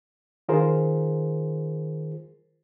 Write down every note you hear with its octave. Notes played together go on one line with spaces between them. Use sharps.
D#3 F4 G#4 A#4 C5